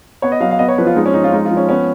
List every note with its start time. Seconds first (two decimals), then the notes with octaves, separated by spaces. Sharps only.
0.22 B3 C#5
0.32 D#5
0.41 F#3 F5
0.51 F5
0.59 B3 D#5
0.68 C#5
0.78 F3 B4
0.87 F4
0.96 G#3 D#4
1.06 C#4
1.14 F3 D#4
1.24 F4
1.33 G#3 D#4
1.45 F4
1.51 F3
1.57 C#4
1.69 B3 C#4